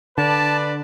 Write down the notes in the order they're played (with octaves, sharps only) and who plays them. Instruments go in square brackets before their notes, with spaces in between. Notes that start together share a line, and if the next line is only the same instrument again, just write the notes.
[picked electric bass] D3 [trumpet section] D4 B4 D5 [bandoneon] A5